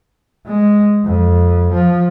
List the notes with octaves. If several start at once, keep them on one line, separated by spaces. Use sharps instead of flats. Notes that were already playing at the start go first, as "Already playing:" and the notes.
G#3
F2
F3